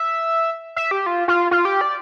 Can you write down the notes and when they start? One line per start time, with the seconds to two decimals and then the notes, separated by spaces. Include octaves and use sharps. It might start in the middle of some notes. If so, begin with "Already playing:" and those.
Already playing: E5
0.76 E5
0.91 G4
1.06 F4
1.28 F4
1.51 F4
1.65 G4
1.81 D5